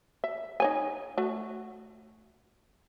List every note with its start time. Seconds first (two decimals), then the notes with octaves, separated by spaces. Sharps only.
0.24 E5
0.60 D#4 C#5 G#5
1.18 A3 F#4